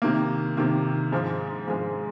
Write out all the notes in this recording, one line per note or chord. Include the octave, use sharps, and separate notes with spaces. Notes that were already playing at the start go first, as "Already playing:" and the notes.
C3 D#3 A#3
C3 D#3 A#3
G#2 F3 G#3
G#2 F3 G#3